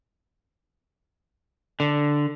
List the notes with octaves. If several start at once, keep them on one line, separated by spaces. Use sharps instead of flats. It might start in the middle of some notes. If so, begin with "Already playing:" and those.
D3